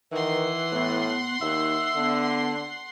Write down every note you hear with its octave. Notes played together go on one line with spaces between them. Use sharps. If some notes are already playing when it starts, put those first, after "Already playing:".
D#3 E3 B4 F#5 C6
A2 B3
D#2 D#4 E5
D3 B3